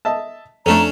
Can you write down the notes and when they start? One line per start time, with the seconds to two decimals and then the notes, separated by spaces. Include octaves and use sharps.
0.05 D#5 E5 A5
0.66 F2 A3 C#4 D4 A4 A#5